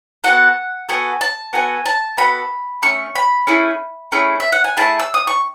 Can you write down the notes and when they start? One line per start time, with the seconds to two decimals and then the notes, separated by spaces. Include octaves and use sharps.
0.24 B3 F#4 A4 F#5
0.89 B3 F#4 A4 G#5
1.21 A5
1.53 B3 F#4 A4 G#5
1.86 A5
2.17 B3 F#4 A4 B5
2.82 A3 C#4 C#6
3.15 B5
3.47 A3 C#4 E4 G#4
4.12 A3 C#4 E4 G#4
4.40 E5
4.52 F#5
4.64 G#5
4.77 A3 C#4 E4 G#4 A5
4.99 E6
5.14 D#6
5.27 C#6